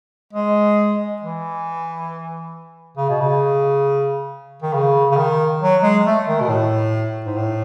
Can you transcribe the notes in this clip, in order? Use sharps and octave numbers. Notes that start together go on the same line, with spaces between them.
G#3
E3
C#3
B2
C#3
D#3
C#3
C#3
D#3
F#3
G#3
A3
D#3
B2
A2
G#2
A2